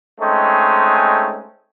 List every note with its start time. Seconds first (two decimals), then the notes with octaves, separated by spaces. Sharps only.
0.20 G#3 A3 C4 C#4 D#4